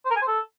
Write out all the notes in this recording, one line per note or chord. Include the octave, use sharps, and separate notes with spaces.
C5
A#4
G#5
C5
A4